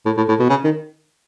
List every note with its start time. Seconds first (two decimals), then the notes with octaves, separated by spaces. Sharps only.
0.06 A2
0.17 A2
0.29 A2
0.39 B2
0.50 C#3
0.64 D#3